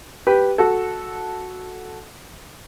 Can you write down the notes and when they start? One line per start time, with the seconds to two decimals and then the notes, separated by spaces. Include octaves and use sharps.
0.27 G4 B4
0.58 F#4 A4